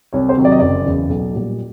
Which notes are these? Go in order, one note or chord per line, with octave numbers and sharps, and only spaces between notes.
C2 C#5
C5
C3 D#3 F#3
D5
D#5
F#1 D5
E2 C#3
B1
A#2 G3